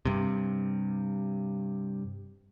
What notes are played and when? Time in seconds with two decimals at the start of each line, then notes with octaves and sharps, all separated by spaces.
0.05 G2 C3